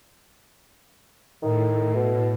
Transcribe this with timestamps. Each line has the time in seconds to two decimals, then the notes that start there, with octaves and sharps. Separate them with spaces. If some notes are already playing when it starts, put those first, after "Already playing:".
1.43 A2 D#3
1.95 B2